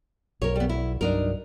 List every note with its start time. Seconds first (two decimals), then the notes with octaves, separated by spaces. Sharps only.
0.42 B1 A#4 C#5
0.56 G3 B3
0.69 E4
1.01 C2 G2 F#3 D4 D#4 A#4